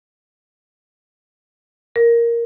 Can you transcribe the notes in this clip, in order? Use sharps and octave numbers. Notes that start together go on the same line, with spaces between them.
A#4